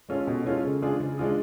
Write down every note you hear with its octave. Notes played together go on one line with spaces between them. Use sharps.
G#3 C#4 F4 A4
B2
G#3 C#4 F4 A4
C#3
G#3 D4 F4 G#4
C#3
G#3 D4 F4 G#4